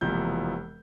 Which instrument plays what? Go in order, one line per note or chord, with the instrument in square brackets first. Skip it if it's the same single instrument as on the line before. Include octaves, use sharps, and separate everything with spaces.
[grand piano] E1 E2 C3 F3 A#3 G6